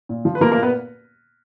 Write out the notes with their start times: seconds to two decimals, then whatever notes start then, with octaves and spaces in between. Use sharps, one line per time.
0.09 A#2
0.25 F3
0.35 B4
0.41 F3 A#3 A#4
0.52 A#3 A#4
0.57 A#2
0.63 B3 B4